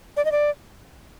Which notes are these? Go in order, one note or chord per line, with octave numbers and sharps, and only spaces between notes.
D5
D#5
D5